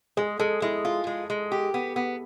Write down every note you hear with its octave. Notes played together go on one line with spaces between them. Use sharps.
G#3 G#4
G#3 A4
G#3 E4
F4
G#3
G#3
G4
B3
B3